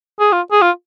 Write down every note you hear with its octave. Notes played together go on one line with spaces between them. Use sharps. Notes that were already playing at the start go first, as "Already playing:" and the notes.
G#4
F4
G#4
F4